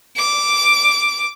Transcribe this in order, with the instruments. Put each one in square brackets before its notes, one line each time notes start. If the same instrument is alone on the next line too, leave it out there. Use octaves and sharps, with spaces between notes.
[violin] D6